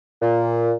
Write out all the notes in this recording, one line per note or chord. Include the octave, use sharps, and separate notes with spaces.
A#2